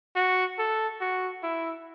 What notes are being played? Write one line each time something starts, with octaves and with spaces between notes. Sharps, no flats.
F#4
A4
F#4
E4